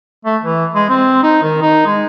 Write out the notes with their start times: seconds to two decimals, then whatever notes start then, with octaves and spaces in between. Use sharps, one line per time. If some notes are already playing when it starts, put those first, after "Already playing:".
0.25 A3
0.43 E3
0.75 G#3
0.89 C4
1.23 D#4
1.43 D#3
1.62 D#4
1.86 G#3